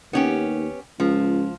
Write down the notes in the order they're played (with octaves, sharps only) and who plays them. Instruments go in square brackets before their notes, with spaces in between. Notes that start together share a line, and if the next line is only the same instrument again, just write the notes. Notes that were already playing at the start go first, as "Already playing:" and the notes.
[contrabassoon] D#2 [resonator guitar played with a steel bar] B3 C#4 G4
[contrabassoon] C#2 [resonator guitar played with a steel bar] F3